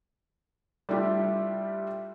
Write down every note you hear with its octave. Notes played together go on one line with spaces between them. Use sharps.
G3 A3 D4 E4 F4 G4